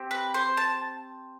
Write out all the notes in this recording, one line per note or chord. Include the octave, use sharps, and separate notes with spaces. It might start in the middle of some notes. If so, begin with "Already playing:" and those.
Already playing: C4 G4
B4
C5
A5